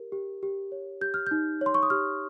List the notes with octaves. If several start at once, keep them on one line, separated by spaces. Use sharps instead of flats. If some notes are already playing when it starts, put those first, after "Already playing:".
Already playing: G4 A#4
G4
G4
C#5
G4 G6
F6
D#4 G6
C#5 C6
C#6
D#6
G4 F6